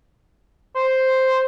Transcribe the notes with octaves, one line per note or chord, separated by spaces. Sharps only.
C5